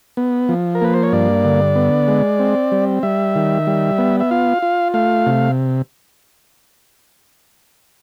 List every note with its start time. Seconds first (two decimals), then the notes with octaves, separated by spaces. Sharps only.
0.17 B3
0.49 F3
0.75 A#4
0.81 A#3 B4
0.94 C5
1.03 C#5
1.12 G2 D5
1.45 D3
1.76 B3
2.08 G#3
2.39 C4
2.72 G3
3.03 G3 E5
3.35 D#3
3.67 G3
3.98 B3
4.20 E5
4.31 F4 F5
4.62 F4
4.94 A3 F5
5.26 C3